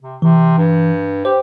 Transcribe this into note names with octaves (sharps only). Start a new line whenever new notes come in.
C3
C3 E3
G2
G4 C5